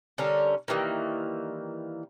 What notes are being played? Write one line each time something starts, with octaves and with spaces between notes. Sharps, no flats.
D3 G3 C#4 A#4
D#3 E3 G3 A#3